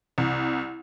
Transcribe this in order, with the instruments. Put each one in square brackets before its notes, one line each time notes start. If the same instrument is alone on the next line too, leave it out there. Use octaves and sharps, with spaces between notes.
[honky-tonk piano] C2